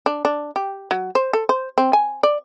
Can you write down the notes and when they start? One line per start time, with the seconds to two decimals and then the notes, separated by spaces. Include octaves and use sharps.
0.06 D4
0.25 D4
0.56 G4
0.91 F#3
1.15 C5
1.33 A4
1.49 C5
1.78 C4
1.93 G#5
2.23 D5